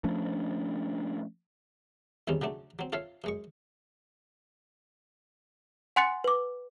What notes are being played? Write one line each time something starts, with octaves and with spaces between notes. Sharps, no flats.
F3 A3 C#4 D4
E2 D#3 G3 C4 C#4
C#3 F#3 A3 D4
F#3 C4
F4 A4 C#5 E5 F5
F#2 G#3 C#6
F#5 G#5 C6 F#6 A6 C#7
B4 D6